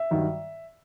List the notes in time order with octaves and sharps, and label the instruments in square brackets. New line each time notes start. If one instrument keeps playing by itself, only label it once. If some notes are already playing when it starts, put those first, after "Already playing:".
Already playing: [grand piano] E5
G2 D#3 F#3